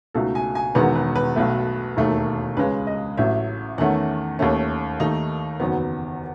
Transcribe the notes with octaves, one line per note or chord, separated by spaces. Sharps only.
C#2 B2 A3 D#4 A4
G#5
G#5
E1 E2 D#3 G#3 B3 B4
B4
B4
B1 B2 A3
E1 D#2 D#3 A3
C#2 C#3 G#3 C#4 B4
D#5
A1 A2 F#3 E5
E2 D#3 A3 C#4 F#5
D#2 D#3 A3 C#4
D#2 D#3 A3 D#4
F#1 E2 D#3 F#3 B3